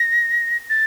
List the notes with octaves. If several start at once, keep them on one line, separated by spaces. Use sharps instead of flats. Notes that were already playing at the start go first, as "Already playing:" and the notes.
Already playing: A#6
A6